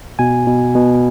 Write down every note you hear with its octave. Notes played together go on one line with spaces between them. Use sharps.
B2 G#5
B2
B2